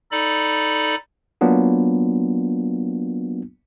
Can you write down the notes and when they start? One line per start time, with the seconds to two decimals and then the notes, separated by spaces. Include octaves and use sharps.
0.11 D#4 A4 D5 B5
1.41 F#3 A#3 B3 D4 F4